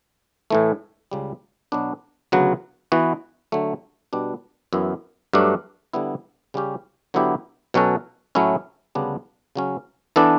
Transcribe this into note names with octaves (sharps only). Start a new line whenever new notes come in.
A2 E3 A3
C#2 C#3 G3
B2 F#3 B3 D4
D2 C#3 F#3 B3 F#4
E3 B3 F#4
D3 F#3 A3
B2 G3 D4
F#2 E3 B3 E4
G2 F#3 A3 D4
D3 G3 B3 E4
C#3 G3 C#4 G4
D3 F#3 B3 E4 G4
B2 F#3 C#4 F#4 A4
A2 F#3 A3 C#4 E4
D2 C#3 G3 B3 D4
C#3 F#3 C#4
E3 B3 D4 A4